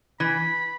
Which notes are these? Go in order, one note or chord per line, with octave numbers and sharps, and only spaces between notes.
E3 B5